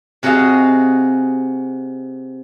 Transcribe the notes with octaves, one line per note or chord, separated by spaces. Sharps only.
C3 F#4 G#4 D#5 F5